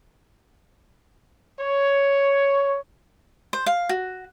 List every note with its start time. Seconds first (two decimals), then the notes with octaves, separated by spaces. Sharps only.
1.60 C#5
3.53 C5
3.66 F5
3.89 F#4